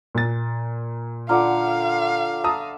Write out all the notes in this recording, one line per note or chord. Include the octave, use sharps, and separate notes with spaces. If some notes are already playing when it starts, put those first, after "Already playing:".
A#2 A6
D3 F4 D5 F5 F#5 A#5 F6
E5 A5 A#5 D#6